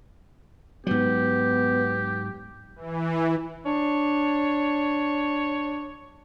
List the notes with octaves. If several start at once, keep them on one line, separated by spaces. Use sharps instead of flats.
G#2 F#3 B3 G4
E3
D4 C#5